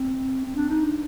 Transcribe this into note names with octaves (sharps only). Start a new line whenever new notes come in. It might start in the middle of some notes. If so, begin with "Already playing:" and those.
Already playing: C4
C4
D4
D#4
D4